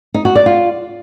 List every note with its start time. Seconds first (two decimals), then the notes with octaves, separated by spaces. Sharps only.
0.14 D#4
0.25 F#4
0.35 D5
0.46 F4